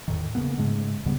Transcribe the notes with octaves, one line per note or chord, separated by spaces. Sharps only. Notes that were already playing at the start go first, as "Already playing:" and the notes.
E2 A2 D#3
C#3 A#3 B3
G#2 C#3 G#3 A3
C#2 C#3 G3 B3